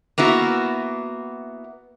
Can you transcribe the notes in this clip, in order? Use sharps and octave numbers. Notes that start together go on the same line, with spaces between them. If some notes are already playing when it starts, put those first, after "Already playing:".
A#3 B3 E4 F#4